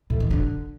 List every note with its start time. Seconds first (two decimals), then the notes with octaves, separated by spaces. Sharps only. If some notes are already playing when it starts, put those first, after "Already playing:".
0.10 A2
0.20 D#3
0.31 D3